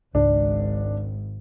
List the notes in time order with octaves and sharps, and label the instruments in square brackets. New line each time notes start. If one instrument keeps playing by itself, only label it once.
[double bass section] G#1 [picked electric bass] C#2 G#2 [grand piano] D4